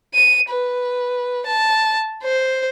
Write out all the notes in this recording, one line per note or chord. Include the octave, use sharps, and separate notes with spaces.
D#7
B4
A5
C5